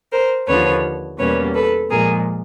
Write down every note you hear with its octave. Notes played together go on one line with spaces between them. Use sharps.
A#4 C5
D#2 D3 F3 B4 C#5
E2 B2 G3 A#3 C#4 B4 C#5
A4 B4
A#2 F3 G#3 G#4 A#4